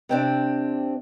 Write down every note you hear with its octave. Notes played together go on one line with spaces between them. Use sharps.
C3 C4 D4